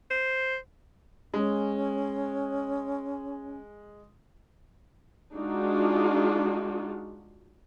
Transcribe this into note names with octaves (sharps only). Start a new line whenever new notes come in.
C5
G#3 C#4
G#3 D4 D#4 F4 F#4